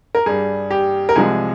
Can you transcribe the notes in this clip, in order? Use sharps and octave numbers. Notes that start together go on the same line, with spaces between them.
A#4
G2 G3 G#4
G4
A#4
C2 C3 F3 G#3 G#4